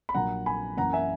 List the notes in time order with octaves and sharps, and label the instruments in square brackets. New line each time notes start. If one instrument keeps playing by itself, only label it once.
[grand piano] B5
A#1 A#2 F#3 A#3 F#5 A#5
G#5 B5
F#2 E3 A#3 F#5 A#5
E5 G#5